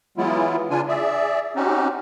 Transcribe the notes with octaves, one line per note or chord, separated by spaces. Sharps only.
E3 F#3 G#3 B3 E4 F4
C#3 D4 F4 G#5
G#4 D5 E5
C4 C#4 D#4 F#4 G4